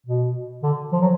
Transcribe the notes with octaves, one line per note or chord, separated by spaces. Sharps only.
B2
D3
F3
F#3